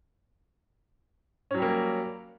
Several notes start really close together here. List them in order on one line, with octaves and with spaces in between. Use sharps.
C#4 F#3 G3 A#3